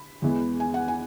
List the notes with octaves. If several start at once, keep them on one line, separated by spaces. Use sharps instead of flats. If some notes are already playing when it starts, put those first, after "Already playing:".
Already playing: B5
E2 E3 G#3 B3
G#5
F#5
G#5